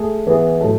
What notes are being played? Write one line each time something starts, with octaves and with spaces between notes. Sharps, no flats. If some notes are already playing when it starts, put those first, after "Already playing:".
Already playing: A3 G#4
E3 B3 E4 G#4
A2 F#3 A3